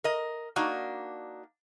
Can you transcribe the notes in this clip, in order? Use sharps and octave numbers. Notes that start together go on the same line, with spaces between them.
A#4 D#5
A#3 D4 D#4 F#4